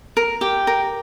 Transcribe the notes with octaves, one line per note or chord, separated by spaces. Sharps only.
A#4
G4
A#4